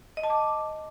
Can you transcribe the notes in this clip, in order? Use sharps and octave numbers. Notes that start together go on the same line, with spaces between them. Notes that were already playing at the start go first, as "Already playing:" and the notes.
D#5
A5
D6